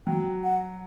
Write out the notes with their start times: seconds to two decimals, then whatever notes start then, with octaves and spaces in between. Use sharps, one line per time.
0.07 F#3 G5
0.44 F#5